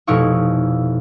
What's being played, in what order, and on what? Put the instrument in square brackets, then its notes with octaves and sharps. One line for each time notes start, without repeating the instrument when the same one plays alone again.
[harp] F1 B2 D#4 E4 F5 C#6